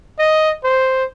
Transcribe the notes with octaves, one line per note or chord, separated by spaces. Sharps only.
D#5
C5